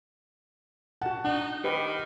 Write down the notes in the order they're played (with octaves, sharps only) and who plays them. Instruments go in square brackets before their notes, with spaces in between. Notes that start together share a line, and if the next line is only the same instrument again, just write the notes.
[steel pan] F#4 A5 [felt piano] F#5
[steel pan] D4 [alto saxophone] D#4 [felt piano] F#5
[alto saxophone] D#3 [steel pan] G4 B4 D#5